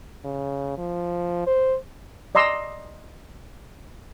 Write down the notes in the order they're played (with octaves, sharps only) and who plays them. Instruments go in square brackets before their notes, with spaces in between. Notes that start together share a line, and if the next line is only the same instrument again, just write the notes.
[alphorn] C#3
F3
C5
[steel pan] D5 D#5 A#5 C6 E6